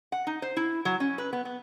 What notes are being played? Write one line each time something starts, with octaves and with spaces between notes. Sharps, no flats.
F#5
D#4
C5
E4
F#3
C#4
B4
B3
B3